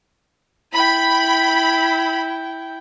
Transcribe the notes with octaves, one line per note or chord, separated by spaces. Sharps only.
E4 G5 B5